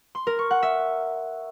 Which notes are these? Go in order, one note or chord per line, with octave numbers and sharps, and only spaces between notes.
C6
A#4
C#6
F#5
E5